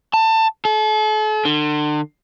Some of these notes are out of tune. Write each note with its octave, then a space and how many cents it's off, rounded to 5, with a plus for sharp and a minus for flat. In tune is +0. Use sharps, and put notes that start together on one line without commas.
A5 +20
A4 -40
D3 +35